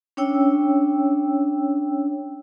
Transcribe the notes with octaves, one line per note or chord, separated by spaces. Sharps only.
C#4 D4 C#5 G5 E6